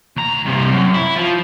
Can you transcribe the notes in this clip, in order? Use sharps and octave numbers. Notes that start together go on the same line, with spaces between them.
D2 A#5
G2 C3
F#2
E4
F3